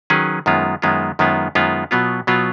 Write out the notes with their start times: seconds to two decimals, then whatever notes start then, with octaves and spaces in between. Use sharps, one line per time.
0.10 D#3 F#3 C#4 G#4 B4
0.46 F#2 D#3 G#3 B3 F4
0.82 F#2 D#3 G#3 B3 F4
1.19 F#2 D#3 G#3 B3 F4
1.55 F#2 D#3 G#3 B3 F4
1.91 B2 F#3 B3 F4
2.27 B2 F#3 B3 F4